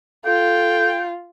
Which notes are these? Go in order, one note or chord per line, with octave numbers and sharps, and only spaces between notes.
F4 A4 G5